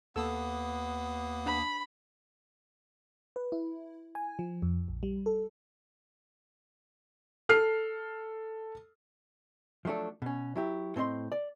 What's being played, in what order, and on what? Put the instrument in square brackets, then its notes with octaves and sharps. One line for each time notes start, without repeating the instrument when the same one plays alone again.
[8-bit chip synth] D#2 A#3 D#6 [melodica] B3 [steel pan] A4 E6
[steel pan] D4 [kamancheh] B5
[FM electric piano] B4
E4
G#5
F3
F2
A#1
G3
A4
[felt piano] A4 F6 C7
[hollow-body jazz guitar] F3 F#3 A3 D4 A4
B2 C#4
F#3 E4 G4
A2 C4 C#5 D#5 C6
D5